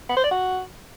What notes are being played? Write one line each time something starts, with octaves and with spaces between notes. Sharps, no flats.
B3
C5
D5
F#4